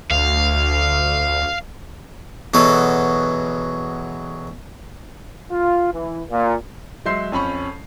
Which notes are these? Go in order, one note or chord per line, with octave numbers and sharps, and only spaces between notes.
D2 F5
E2 B2 F#3 A4
F4
E3
A#2
F#3 G#3 E5 C6 G6 C7
F2 C#4 B5 C#6